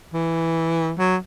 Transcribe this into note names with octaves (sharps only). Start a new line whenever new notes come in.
E3
F#3